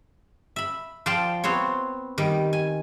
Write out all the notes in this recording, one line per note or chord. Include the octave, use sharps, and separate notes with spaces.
E5 B5
F3 C5 D5 F5 G5 A5
B3 C4 C5 C#5
D#3 G3
G#5